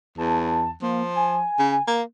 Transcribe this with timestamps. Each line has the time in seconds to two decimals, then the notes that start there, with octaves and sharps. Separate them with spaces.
0.18 E2 A5
0.82 F3 A#3
1.16 G#5
1.59 C#3
1.87 A#3